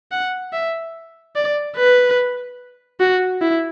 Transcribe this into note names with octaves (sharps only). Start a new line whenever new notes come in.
F#5
E5
D5
B4
F#4
E4